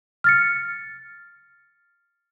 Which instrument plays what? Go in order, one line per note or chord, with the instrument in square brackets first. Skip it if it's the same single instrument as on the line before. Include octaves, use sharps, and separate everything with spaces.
[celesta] F6 A6 C#7